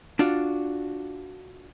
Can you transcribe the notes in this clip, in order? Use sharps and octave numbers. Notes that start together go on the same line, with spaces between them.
D4 F4 F#4 D5